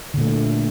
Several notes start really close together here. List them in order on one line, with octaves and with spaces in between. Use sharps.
D3 A#2 A3